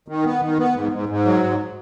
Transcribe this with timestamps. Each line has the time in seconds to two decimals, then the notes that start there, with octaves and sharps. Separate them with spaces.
0.08 D#3
0.25 B3
0.41 D#3
0.58 B3
0.75 G#2
0.92 G#2
1.09 G#2
1.26 F#3
1.43 G#2